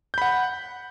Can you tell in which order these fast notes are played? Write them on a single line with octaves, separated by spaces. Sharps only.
G6 B5 F#5